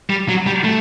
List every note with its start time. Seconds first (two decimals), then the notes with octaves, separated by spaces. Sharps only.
0.10 G3
0.29 F#3
0.47 G3
0.64 A3